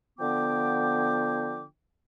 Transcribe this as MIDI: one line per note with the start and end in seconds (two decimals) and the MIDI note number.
0.18 1.63 50
0.18 1.63 53
0.18 1.63 59
0.18 1.63 79
0.18 1.63 86